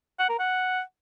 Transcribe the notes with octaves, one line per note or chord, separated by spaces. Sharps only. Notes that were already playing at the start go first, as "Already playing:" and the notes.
F#5
A#4
F#5